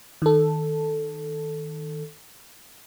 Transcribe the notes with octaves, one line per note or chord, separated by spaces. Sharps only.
D#3 A4